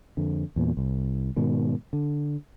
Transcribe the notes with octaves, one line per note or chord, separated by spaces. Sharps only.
F2 D3
E2 A#2
C2
G#2 B2 D#3
D3